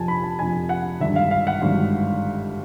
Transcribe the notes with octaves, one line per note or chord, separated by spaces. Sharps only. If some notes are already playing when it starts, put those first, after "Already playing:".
Already playing: F2 C3 F3 G#5 A5
B5
A5
F2 C3 F3 G#5
F#5
G#1 G2 D3 E5
F5
F5
F#5
G#1 G2 D3